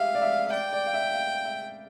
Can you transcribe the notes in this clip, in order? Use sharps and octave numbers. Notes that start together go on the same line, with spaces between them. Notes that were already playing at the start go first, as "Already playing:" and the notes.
Already playing: G4 E5 F5
D5
E5
E5
D5 G5
D5
F5
E5
F5
E5